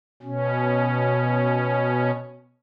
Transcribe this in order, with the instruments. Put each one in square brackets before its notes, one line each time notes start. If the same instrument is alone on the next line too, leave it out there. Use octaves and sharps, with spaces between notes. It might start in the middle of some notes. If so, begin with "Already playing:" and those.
[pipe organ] B2 C#4